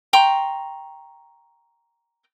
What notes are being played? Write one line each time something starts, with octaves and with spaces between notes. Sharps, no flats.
G5 A#5 C6 C#6